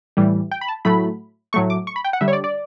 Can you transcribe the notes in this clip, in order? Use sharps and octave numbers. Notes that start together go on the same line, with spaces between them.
A2 E3 G3
G5
B5
A5
A2 F#3 A3 B5
A2 F#3 A3 C#6
D6
C#6
B5
G5
F#5
D3 G3 E5
C#5
D5
D5